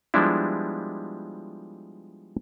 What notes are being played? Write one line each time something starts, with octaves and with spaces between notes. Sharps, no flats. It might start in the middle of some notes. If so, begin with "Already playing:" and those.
F3 G3 G#3 B3 D4 E4